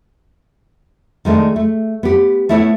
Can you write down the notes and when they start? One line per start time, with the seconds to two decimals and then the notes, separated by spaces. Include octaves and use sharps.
1.25 D#3 G#3 A3 D4
1.56 A3
2.03 B3 G4
2.49 A3 B3 E4 A4 A#4 C#5